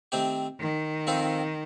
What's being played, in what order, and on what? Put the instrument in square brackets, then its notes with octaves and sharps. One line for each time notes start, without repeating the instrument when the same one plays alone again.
[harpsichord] D#3 A3 C4 G4 C5
[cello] D#3
[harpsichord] F3 C4 F4 A4 C5